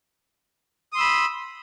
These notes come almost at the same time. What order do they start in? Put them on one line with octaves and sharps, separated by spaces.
D#6 C6 E6 B5